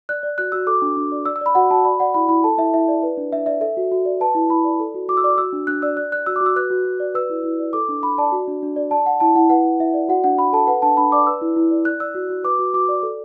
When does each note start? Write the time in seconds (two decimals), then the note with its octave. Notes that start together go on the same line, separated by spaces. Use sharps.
0.09 D5 F#6
0.23 D5
0.38 F#4 F#6
0.52 F#4 E6
0.67 A4 D6
0.82 D4
0.97 D4
1.12 D5
1.26 D5 E6
1.36 E6
1.41 D5 B5
1.55 F#4 F#5
1.71 F#4 A5
1.85 D5 B5
2.00 D5 F#5
2.14 E4 B5
2.29 E4 B5
2.44 A4 A5
2.58 E4 E5
2.74 E4 E5
2.88 D5
3.03 B4
3.17 D4
3.33 D4 E5
3.46 D5 E5
3.61 A4 E5
3.77 F#4
3.92 F#4
4.05 D5
4.21 B4 A5
4.35 E4
4.50 E4 B5
4.64 D5
4.80 A4
4.94 F#4
5.09 F#4 D6
5.17 E6
5.24 D5 D6
5.38 F#4 E6
5.53 D4
5.67 D4 F#6
5.82 D5 E6
5.96 D5 F#6
6.12 D5 F#6
6.26 F#4 E6
6.36 D6
6.41 F#4
6.46 E6
6.56 B4 F#6
6.70 F#4
6.85 F#4
7.00 D5
7.14 B4 E6
7.30 E4
7.44 E4
7.59 D5
7.73 A4 D6
7.89 D4
8.03 D4 B5
8.18 D5 A5
8.32 F#4
8.48 D4
8.63 D4
8.76 D5
8.91 D5 A5
9.06 D5 F#5
9.20 E4 A5
9.35 E4 F#5
9.50 B4 F#5
9.65 E4
9.80 E4 E5
9.94 D5
10.09 F#4 F#5
10.24 D4 F#5
10.38 D4 B5
10.53 A4 A5
10.67 B4 F#5
10.82 D4 A5
10.97 D4 B5
11.12 D5 D6
11.27 B4 E6
11.42 E4
11.56 E4
11.71 D5
11.85 D5 F#6
12.00 D5 E6
12.15 F#4
12.30 F#4
12.44 B4 D6
12.59 F#4
12.74 F#4 D6
12.89 D5
13.03 A4